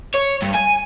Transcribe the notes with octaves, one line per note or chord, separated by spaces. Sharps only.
C#5
G2
G#5